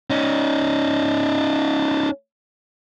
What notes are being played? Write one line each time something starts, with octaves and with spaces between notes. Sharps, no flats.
C#4 D#4